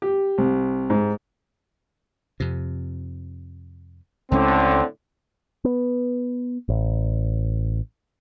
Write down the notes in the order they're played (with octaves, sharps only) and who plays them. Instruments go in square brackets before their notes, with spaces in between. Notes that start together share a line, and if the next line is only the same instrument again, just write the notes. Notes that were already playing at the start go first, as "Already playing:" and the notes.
[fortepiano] G4
C2
G#2
[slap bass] F2 C3
[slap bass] C#2 G#3 C#4 [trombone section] A2 D3 [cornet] C4
[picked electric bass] B3
A1